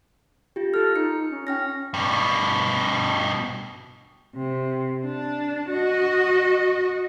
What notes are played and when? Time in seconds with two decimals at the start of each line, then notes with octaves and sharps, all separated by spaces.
0.56 F4 G4
0.74 F4 A4 F6
0.96 D#4 C#7
1.31 C#4
1.47 C#4 G5 F6 A#6
1.94 G2 B2
4.36 C3
5.06 D4
5.71 F#4 D#5